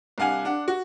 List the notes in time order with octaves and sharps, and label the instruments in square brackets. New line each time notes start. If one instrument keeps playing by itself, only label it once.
[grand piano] C2 D4 F5 F#5 G#5
D4 F#5
F#4